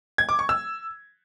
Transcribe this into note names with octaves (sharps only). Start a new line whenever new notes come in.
G#6
D6
C#6
E6